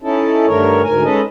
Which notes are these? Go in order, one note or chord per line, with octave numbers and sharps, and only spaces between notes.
C#4 D#4 E4 A4
G2 D3 D#3 A3 A#4 C#5
D2 G#2 A#4 G#5
G#3 C#4 D#4 A4 B4 D#5